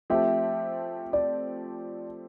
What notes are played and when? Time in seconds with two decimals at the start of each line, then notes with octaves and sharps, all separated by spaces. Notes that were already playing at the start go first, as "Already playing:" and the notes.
0.10 F3 A3 C4 G4 E5
1.13 D5